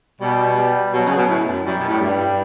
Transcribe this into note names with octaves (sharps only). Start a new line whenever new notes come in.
B2 G3
G3
B2 F#3
C#3
B2
A2
F#2
F#2 G3
B2
A2
G2 G3